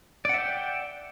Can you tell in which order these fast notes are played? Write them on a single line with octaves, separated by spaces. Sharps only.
D5 F#5 E5 G5